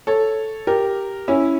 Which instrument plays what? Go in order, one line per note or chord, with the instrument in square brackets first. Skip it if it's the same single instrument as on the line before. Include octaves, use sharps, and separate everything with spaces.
[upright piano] A4 C#5
G4 A#4
C#4 E4